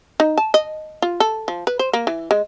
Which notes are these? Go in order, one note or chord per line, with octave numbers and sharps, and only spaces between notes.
D#4
A5
D#5
F4
A4
F3
B4
C5
A#3
E3
G#3